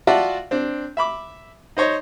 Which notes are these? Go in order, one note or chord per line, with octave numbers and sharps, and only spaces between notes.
F4 F#4 D5 E5 F#5 A5
C4 D4
E5 B5 D6
D#4 C5 C#5 D#5